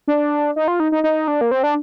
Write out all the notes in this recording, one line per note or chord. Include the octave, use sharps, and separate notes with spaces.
D4
D#4
F4
D#4
D#4
D#4
D4
A#3
C4
D4